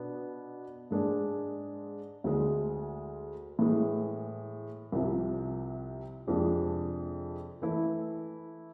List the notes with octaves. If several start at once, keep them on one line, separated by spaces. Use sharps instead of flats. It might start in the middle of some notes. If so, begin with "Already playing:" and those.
Already playing: B2 B3 D4
G#2 G#3 D4 G#4
D2 D3 G#3
A2 E3 G#3
C2 C3 F3
F2 C3 F3 G#3 D4
E3 A3 E4